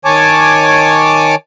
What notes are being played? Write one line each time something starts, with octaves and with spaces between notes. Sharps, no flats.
D#3 C#5 G#5 A5 D6